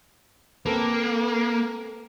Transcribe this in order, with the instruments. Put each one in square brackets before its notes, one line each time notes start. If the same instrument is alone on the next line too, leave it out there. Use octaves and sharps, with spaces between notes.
[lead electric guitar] A#3 [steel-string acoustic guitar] C4 A4 B4